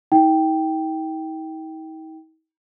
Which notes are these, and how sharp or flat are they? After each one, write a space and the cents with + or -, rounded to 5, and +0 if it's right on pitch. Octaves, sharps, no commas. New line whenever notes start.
D#4 +45 G5 +0